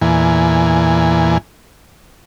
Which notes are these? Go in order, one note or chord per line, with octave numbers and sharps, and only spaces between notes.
E2 A#2 E3 G#5